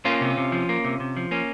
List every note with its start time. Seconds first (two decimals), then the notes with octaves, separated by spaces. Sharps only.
0.05 A#3 C#4 F4
0.21 C3
0.37 C3
0.52 F3
0.69 A#3
0.85 C3
1.00 C3
1.17 F3
1.31 A#3 C#4